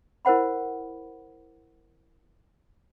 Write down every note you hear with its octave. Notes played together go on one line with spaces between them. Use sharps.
E4 A#4 C5 F#5 B5